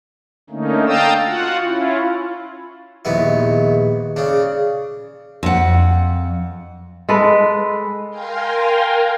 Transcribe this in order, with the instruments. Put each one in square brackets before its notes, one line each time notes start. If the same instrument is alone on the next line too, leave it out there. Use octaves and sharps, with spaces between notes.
[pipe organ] D3 A3 A#3 C#4 D#4
F5 G5 A5 A#5 D#6 E6
F4 F#4 F#5
C#4 E4 F4
[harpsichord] A#1 D#2 B3 E4
C#3 D4
[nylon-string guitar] F2 F#5
[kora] G#3 A4 B4
[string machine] A#4 F5 G5 G#5 A#5 C6